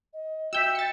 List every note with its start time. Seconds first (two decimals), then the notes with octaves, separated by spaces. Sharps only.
0.13 D#5
0.53 F#4 E5 G5 E6 G6 B6
0.75 A6 C#7